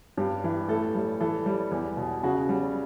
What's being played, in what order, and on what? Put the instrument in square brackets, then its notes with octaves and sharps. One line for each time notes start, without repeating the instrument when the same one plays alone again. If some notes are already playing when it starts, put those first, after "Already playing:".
[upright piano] G2 G4
E3
A2 A4
G3
E3 A4
G3
E2
B2
C#3 F#4
G3